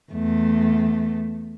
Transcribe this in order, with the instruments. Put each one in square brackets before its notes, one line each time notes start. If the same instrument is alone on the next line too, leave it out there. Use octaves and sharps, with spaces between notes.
[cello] E2 A3